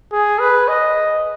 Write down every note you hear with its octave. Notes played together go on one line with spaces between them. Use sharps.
G#4
B4
D#5